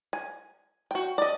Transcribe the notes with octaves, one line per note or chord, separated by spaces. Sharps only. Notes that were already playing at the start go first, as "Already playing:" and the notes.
G#5
F#4 G5
D5 D#5